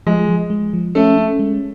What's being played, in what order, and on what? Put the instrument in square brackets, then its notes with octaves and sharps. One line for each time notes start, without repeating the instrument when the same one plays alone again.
[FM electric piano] F3 [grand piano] G#3
[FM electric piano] F3
G#3
F3
[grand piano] A3 [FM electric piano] C#4
[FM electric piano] C#4
G#3